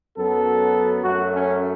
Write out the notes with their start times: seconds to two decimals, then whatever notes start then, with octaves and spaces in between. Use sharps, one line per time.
0.16 F#2 F#3 B3 A4
1.02 F#2 F#3 A3 F#4
1.31 C#4